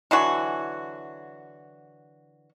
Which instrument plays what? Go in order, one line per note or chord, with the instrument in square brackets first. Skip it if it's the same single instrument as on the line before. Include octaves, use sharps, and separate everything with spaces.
[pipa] D3 E3 F#3 F#4